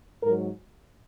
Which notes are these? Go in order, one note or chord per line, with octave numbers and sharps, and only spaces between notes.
G#2 F#3 A#4